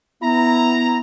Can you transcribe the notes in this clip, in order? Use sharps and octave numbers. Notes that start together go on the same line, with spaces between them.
B3 E4 A#5